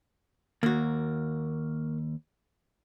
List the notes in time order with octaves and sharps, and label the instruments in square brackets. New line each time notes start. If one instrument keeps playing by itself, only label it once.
[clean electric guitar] D#2 [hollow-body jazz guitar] A#3 F#4